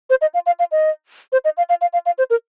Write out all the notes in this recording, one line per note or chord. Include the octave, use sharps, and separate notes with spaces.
C5
D#5
F5
F5
F5
D#5
C5
D#5
F5
F5
F5
F5
F5
C5
A#4